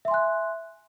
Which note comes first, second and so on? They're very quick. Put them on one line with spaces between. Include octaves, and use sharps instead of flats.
E5 C6 G#5 F#6